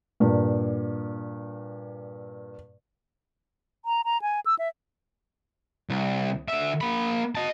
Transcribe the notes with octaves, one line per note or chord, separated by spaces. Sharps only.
G2 A#2
A#5
A#5
G#5
E6
E5
C2
D3 E5
A#3 B5
D#5 A5